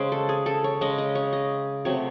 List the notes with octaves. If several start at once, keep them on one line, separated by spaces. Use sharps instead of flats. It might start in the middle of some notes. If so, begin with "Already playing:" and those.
Already playing: C#3 G#3 C5
A4
G#4
A4
C#5
C#3 G#3 D#5
D#5
C#5
D#5
C3 F#3 A3 C#5